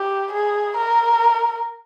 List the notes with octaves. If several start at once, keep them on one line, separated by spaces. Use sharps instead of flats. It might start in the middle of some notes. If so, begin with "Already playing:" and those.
Already playing: G4
G#4
A#4